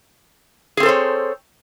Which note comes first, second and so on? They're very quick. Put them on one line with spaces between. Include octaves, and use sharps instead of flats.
G#4 C4 A4 C5 C#5